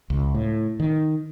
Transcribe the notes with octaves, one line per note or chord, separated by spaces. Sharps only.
C#2
A2
D#3